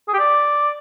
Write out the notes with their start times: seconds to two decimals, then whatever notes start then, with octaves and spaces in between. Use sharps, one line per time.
0.08 G#4
0.13 G4
0.19 D5